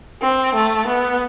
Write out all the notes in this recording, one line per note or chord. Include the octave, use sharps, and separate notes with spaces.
C4
A3
B3